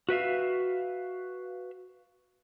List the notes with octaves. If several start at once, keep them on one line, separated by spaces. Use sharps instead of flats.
F#4 B4 E5 F5